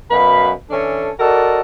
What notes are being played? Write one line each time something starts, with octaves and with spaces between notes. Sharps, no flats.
F#2 B2 B4 F5 B5
E3 C#4 D4 A4
F#4 A4 A#4 D5 D#5